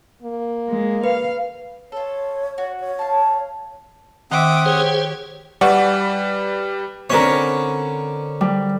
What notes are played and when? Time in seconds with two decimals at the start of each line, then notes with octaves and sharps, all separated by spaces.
0.22 A#3
0.70 G#3
1.04 B4 F5
1.92 F4 A4 C#5
2.58 F#4
2.80 C#5
2.99 F5 A5
4.32 D#3 C4 E5 F#5 D6 D#6
4.66 G4 G#4 C5 C#5
5.61 E3 G3 F#4 B4 D5
7.10 D3 C4 C#4 A#4 B4 C#5
8.41 G3